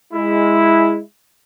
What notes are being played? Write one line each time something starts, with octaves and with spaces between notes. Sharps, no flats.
G#3 E4